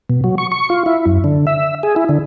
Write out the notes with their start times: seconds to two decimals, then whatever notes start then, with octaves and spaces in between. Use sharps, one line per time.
0.10 B2
0.24 F#3
0.38 C#6
0.52 C#6
0.70 F4
0.86 E4
1.06 F#2
1.24 D3
1.47 E5
1.83 G#4
1.96 E4
2.09 D3